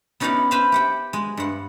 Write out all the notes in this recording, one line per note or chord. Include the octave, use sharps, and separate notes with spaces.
B3 C#4 D#4 D5 F5 F#5
B4 C5 E5 F5
G4 F#5 G5
G#3
G2 F#5